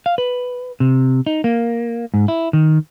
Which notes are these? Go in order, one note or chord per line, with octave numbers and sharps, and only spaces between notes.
F5
B4
C3
D#4
A#3
G#2
E4
D#3